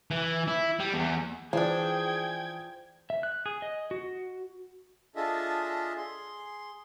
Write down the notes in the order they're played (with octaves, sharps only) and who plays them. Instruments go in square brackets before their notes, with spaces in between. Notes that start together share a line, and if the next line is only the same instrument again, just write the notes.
[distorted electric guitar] E3
E4
G3
E2
[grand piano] E3 D5 [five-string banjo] F3 D4 [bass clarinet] G#4 [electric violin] G5 G#6
[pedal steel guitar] E5
F#6
G#4
D#5
F#4
[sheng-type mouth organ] D4 F4 G#4 A4 D#5 E5
G#4 C6